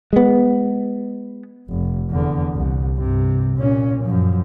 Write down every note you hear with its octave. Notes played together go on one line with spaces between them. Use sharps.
G#3 B3
F1
E2 D3
C2
G2 C3
A#2 C#4
F#2 F3